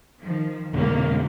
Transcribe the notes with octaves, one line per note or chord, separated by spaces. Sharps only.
D#3 F3
F1 C#2 B2 D3 A#3